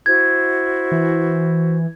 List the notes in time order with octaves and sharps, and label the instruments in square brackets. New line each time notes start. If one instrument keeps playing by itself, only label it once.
[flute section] E4 F#4 C5 [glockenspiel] G#6
[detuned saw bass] E3